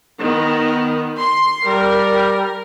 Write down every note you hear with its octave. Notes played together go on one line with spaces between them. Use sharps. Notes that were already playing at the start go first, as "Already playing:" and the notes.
D#3 B3
C6
G3 A#4